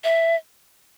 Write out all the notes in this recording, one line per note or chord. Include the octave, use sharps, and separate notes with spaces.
E5